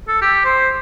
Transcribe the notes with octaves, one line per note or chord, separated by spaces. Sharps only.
A4
G4
C5